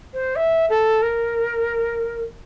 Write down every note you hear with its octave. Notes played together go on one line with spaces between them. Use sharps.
C5
E5
A4
A#4